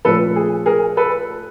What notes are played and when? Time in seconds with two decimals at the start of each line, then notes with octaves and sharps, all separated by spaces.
0.05 A#2 F3 A3 C#4 A4 B4
0.36 G#4
0.66 G#4 A#4
0.97 A4 B4